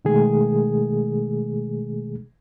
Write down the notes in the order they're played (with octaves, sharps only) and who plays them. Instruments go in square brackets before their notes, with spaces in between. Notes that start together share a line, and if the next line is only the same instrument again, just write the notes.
[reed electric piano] B2 D#3 G#3 A3 G#4